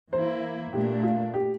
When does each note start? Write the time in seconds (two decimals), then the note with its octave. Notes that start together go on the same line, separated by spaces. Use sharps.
0.12 E3 A#3 E4 C5
0.73 A#2 A3 D4 G4
1.03 F4
1.34 G4